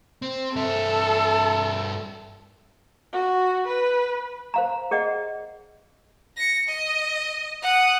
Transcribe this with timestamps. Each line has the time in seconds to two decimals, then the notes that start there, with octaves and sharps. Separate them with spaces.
0.22 C4
0.56 G2 A4 E5
3.13 F#4
3.67 B4
4.54 C5 F5 A#5
4.91 G#4 D5 D#5 F#5
6.37 A#6 C#7
6.68 D#5
7.62 F#5 D#6